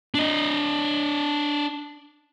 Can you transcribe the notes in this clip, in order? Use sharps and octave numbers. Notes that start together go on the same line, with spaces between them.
D4 D#5